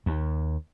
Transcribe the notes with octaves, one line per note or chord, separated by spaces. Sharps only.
D#2